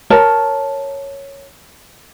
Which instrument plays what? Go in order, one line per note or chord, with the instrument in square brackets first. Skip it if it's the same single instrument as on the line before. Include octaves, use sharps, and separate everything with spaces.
[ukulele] A#4 C#5 A5